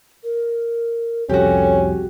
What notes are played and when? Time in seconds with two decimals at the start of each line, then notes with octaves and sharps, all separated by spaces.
0.24 A#4
1.29 C2 F2 C#4 F#4 G4 A4